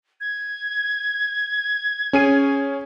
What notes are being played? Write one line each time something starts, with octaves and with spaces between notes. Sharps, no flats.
G#6
C#4 G#4 D#7